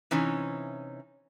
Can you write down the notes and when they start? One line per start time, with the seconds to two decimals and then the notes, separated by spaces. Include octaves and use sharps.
0.11 C3 E3 C#4 D#4